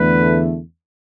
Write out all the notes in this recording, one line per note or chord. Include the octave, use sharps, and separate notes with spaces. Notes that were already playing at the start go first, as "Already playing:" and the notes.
Already playing: E2 D3 A3 B4